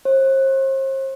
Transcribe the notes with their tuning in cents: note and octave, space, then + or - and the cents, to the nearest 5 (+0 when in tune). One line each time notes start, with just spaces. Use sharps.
C5 +40